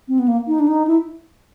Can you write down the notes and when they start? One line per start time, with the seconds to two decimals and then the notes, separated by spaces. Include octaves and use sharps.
0.08 C4
0.19 B3
0.28 A#3
0.48 D#4
0.60 D4
0.68 D#4
0.87 E4